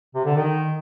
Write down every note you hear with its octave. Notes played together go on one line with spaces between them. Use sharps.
C3
D3
D#3